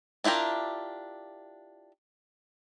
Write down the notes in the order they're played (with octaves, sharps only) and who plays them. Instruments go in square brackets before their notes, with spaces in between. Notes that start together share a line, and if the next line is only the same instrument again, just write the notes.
[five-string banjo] D4 E4 F4 G4 A#4